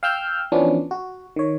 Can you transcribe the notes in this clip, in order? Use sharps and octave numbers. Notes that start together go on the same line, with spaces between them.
F5 G5 E6 F6 G6
E3 F3 B3 C#4 D4
F#4
D#3 C#5